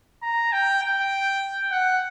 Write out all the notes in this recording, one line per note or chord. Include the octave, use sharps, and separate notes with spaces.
A#5
G5
G5
F#5